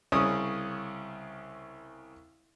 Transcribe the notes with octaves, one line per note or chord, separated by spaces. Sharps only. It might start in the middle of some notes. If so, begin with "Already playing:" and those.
C2 C#3 C#4 D#6